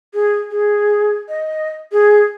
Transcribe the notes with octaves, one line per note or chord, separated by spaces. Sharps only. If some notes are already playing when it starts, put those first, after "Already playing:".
G#4
G#4
D#5
G#4